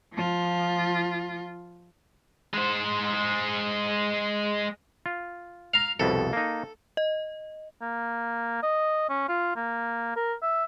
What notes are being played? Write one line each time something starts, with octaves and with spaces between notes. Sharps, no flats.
F3 F4
G#3 C5
F4
F5 A#5
C2 F2 B2 A4
A#3 D#4
D#5
A#3
D#5
C#4
F4
A#3
A#4
E5